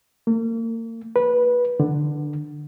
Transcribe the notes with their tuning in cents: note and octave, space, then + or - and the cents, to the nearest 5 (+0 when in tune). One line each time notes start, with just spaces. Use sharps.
A#3 -35
B4 -15
D3 +15